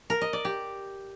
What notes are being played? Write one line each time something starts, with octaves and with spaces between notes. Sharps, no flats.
A#4
D#5
D5
G4